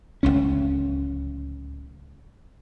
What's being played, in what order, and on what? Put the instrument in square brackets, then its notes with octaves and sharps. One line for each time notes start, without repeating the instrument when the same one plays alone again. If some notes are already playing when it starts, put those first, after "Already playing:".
[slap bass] D1 G1 C#2 C#4